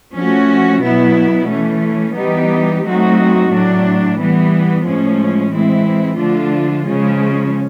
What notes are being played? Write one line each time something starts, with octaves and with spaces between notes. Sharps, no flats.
F3 A3 C#4 F#4
B2 F#3 B3 E4
E3 A3 C#4
E3 G3 B3 D#4 G4
F#3 A3 C4 D#4 F#4
A2 F#3 A3 D4
E3 G3 B3
A2 F3 G#3 C#4
E3 G#3 C4 E4
D3 F3 A3 D4 F4
C#3 F3 G#3 C#4